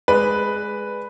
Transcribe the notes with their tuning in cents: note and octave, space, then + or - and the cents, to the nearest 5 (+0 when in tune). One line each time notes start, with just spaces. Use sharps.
G#3 +0 B4 +0 D5 +5